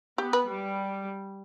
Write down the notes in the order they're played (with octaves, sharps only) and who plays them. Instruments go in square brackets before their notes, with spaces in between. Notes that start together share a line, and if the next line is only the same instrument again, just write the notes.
[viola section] B3 [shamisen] G4
[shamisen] B4
[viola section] G3